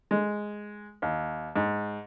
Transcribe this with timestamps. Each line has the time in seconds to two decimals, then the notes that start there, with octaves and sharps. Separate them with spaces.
0.11 G#3
1.02 D#2
1.56 G#2